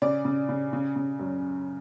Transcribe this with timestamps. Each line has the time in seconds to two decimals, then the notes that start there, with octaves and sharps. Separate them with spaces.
0.02 C#3 D5
0.25 C#3
0.49 C#3
0.73 C#3
0.96 C#3
1.19 F#2